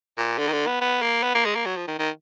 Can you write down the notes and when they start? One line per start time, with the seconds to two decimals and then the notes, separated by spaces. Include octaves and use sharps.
0.18 A#2
0.39 D3
0.48 D#3
0.52 D3
0.67 B3
0.81 B3
1.02 A#3
1.23 B3
1.35 A#3
1.45 G#3
1.55 A#3
1.66 F#3
1.77 F3
1.88 D#3
1.99 D#3